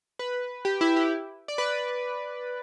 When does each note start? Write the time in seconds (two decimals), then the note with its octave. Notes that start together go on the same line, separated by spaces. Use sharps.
0.19 B4
0.65 G4
0.81 E4
0.96 G4
1.48 D5
1.58 B4